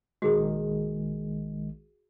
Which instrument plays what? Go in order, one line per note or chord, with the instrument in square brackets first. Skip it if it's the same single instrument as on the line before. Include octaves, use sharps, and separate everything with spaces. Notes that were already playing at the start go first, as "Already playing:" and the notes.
[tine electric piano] A#1 D#3 G#3 [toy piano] F#4 G#4 D#6